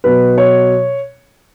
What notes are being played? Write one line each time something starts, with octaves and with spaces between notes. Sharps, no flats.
B2 F#3 B4
C#5